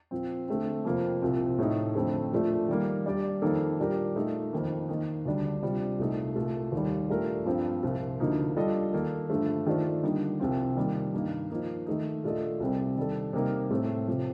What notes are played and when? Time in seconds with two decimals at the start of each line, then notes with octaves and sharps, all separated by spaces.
0.11 A#2 F3 C4
0.48 D3 A3 C4
0.85 F2 C3 F3 A#3 F4
1.22 C2 A#2 F3 C4
1.58 A2 A3 D#4
1.95 F2 D3 A3 C4
2.32 A#2 F3 A3 D4
2.68 D#3 G3 A#3
3.06 G3 D4 G4 D5
3.42 F2 D#3 A#3 D#4 A4
3.79 A#2 G3 D4 G4 A#4
4.16 A#2 A3 D#4
4.53 F2 D#3 A#3
4.88 D#3 A#3 D#4
5.26 D2 D3 G3 D4
5.63 C3 G3 D4 F4
5.99 C2 A#2 A3 D#4
6.36 C2 A#2 A3
6.72 D#2 D#3 G3
7.09 A#2 A3 D4 G4 A#4
7.45 G2 F3 C4
7.83 C2 A#2 F3
8.20 D2 D3 F3 A#3 D#4
8.57 G3 D4 F4 A4 D#5
8.93 D#3 A#3 D#4 A4
9.30 G2 D3 F3 A3
9.67 D#3 A3 D4 F4 C5
10.03 D3 G3 A#3 D#4
10.40 C2 C3 F3 C4 F4
10.77 D#3 G3 A#3
11.14 G2 D#3 A#3 D#4 A#4
11.50 F3 A#3 D#4
11.86 D#3 A3 D#4
12.24 A#2 A3 D4 A4 D#5
12.60 C2 C3 G3 C4
12.97 D#3 G3 D4 A4
13.33 C3 G3 A#3 D#4 A#4
13.70 A2 A3 C4
14.07 C3 F3